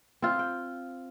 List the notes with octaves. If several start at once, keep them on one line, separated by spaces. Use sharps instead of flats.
C4 F4
G5